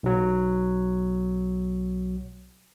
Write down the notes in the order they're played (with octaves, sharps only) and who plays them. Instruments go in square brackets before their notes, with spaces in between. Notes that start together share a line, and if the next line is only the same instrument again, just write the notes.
[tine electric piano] B1 F#3